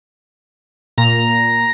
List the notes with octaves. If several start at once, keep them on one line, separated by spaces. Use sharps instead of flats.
A#2 A#5